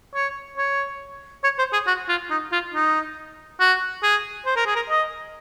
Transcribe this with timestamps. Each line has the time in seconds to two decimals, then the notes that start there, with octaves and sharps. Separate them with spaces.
0.15 C#5
0.58 C#5
1.44 C#5
1.59 C5
1.73 G#4
1.87 F#4
2.09 F4
2.31 D#4
2.52 F4
2.74 D#4
3.60 F#4
4.03 G#4
4.46 C5
4.56 A#4
4.66 G#4
4.76 A#4
4.90 D#5